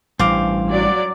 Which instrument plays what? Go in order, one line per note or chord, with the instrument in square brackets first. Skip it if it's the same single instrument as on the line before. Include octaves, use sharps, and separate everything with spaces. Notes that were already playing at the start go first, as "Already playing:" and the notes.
[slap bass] A1 [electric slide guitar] G2 [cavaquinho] C5 F5 D6
[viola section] F#3 D5